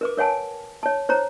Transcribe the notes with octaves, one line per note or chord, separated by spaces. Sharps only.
A#4 B4 D6
A#4 C#5 F#5 G#5 A5
C#5 A5
C5 C#5 A#5